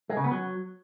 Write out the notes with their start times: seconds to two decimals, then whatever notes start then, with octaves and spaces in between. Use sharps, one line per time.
0.10 G#3
0.17 C#3
0.24 B3
0.31 F#3